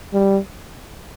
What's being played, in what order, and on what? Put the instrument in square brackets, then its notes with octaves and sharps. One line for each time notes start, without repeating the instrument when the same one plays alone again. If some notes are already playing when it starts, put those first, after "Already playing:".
[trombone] G3